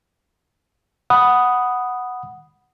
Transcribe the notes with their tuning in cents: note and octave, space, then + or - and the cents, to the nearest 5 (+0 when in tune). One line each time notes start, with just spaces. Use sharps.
F#5 +0 B5 +0 D#6 +0